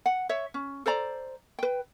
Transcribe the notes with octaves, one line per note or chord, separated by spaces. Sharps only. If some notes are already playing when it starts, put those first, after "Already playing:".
F#5
C#5 E5
C#4
A4 C5 D5 A#5
B4 G5